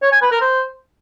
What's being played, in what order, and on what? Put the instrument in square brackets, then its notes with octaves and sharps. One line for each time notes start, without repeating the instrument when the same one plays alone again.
[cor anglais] C#5
G#5
B4
A#4
C5